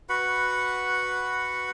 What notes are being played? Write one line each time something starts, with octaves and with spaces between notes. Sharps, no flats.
F#4 B4 F#5 B5